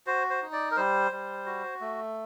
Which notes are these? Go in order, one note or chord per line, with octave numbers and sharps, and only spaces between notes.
F#4 C5
C5
D#4
D5
A#4
G3 C5
G3
F#4
A3